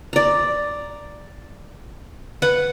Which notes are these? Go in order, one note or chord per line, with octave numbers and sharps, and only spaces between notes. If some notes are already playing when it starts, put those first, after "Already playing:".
D5 A#5
B4 F#5